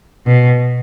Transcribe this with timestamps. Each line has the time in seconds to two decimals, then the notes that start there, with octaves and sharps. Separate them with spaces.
0.26 B2